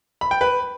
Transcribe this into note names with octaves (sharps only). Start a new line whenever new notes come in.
B5
G5
B4